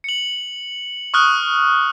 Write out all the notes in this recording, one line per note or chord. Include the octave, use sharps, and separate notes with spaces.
C#7 F#7
C#6 D#6 F6 F#6